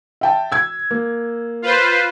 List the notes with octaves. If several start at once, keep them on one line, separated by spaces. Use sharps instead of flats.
E5 G5 A5
E6 G#6
A#3
F4 B4 C5